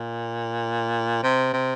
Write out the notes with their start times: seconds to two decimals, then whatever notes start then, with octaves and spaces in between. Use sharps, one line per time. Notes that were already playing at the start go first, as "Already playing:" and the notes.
Already playing: A#2
1.23 C3
1.53 C3